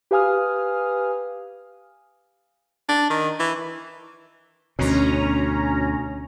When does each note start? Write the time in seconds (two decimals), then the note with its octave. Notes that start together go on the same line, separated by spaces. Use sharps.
0.11 G4 B4 F5 G#5 D#6 F6
2.89 D4
3.10 D#3
3.40 E3
4.79 D2 B2 C#4 A#5